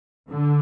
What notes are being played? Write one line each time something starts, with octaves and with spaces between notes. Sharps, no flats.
D3